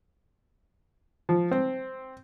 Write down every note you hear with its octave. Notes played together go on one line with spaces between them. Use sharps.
F3
C4